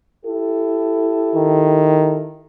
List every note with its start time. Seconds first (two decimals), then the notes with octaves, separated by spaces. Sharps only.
0.24 E4 G4 A4
1.36 D#3